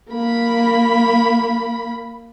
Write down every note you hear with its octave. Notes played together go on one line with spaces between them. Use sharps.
A#3 B5